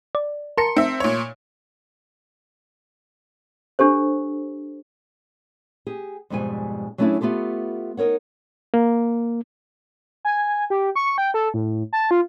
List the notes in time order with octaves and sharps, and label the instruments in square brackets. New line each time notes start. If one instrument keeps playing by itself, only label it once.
[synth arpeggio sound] D5
[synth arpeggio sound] A#4 A5 A#5 [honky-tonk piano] C6 C#7
[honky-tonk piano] C4 E5
A#2 C#5
[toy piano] D4 G4 A4 C5
[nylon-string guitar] G4 G#4
F2 G#2 B2 G3 G#3 G#5
F#3 A3 C#4 D4 E4 G#4
A3 B3 F4 G4 A4
D#4 A#4 C#5 F#5
[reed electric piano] A#3
[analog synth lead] G#5
G4
C#6
G5
A4
A2
A5
F4